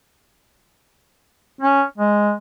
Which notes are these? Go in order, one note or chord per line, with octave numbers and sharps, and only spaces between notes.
C#4
G#3